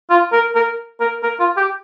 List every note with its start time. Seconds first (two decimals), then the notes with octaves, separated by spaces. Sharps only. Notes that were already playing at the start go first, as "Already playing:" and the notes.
0.10 F4
0.33 A#4
0.55 A#4
1.01 A#4
1.23 A#4
1.40 F4
1.57 G4